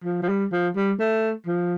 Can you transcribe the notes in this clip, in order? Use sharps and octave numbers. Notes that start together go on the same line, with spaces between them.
F3
F3
G3
F3
G3
A3
F3